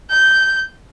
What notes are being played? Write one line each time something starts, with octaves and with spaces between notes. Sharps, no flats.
G6